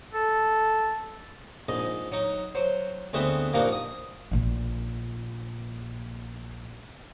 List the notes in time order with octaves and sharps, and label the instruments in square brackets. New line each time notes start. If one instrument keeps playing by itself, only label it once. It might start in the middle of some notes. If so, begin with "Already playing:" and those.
[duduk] A4
[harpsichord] A#1 G#2 D#5
F#3 D#4
F#3 C5
D2 G#3 B3 C4 F#4 E5
G2 A#2 F3 A#3 D#4 F#4
D#6
[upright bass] A#1 A#2